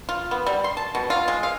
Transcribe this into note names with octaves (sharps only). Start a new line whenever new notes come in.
F4
B3
G3
C6
A5
B2
F4
G#3
F5